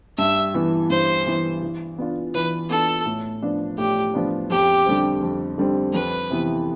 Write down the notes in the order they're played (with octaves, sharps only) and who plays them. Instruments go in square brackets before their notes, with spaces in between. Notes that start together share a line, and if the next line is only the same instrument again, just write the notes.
[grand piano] G2 [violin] E5
[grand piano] E3 B3 E4
[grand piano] G2 [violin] C5
[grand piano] E3 B3 E4
E3
B3 D4 F4
[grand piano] E3 [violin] B4
[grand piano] B3 D4 F4 [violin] A4
[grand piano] A2
F3 B3 D4
[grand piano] A2 [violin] G4
[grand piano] F3 B3 D4
[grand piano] F2 [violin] G4
[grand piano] D3 G3 C4
F2
D3 G3 C4
[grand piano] F2 [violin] B4
[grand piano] C3 E3 B3 E4